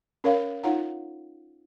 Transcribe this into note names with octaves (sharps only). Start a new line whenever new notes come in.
C#4 A#4 C#5 F5
D#4 F4 C#5 F5 F#5 A#5